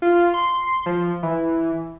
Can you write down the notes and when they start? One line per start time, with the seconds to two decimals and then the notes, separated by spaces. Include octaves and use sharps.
0.02 F4
0.34 C6
0.86 F3
1.23 E3